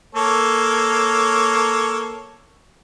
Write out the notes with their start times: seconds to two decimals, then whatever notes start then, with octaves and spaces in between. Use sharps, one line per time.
0.15 A#3 A4 C#5